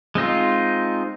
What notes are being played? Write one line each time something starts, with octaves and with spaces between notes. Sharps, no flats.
G#3 C4 D#4 F4